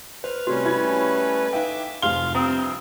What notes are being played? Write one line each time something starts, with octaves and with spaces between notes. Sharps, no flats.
B4 C5 F6
C3 G3 A3 C#4 F#4
E4 B5 G#6
D#4 E5 F5 G5 D6
F1 F3 G4 F5 C6 G7
G2 C3 F3 C4 A#5 D#6